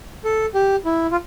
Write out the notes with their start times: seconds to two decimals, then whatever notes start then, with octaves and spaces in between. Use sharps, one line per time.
0.24 A4
0.54 G4
0.85 E4
1.12 F4